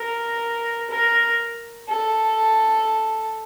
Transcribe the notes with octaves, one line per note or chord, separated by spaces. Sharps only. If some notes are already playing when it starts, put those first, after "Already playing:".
Already playing: A#4
A#4
A4